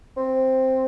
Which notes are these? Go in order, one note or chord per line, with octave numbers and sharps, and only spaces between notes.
C4